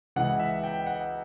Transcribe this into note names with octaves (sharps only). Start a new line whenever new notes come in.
C#2 C#3 E3 F#5
E5
G5
F#5